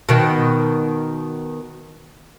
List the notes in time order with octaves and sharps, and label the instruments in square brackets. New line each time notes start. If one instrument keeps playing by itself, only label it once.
[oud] B2 D#3